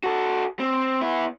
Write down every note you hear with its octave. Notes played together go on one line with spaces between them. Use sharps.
F#4 A4
C4
B3 E4